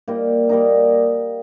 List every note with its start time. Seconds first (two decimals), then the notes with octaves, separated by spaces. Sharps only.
0.08 G3 A#3 D#4
0.49 G3 A#3 D#4